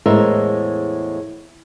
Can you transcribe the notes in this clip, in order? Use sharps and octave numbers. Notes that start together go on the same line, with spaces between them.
E2 A2 G#3 A#4 C5 E5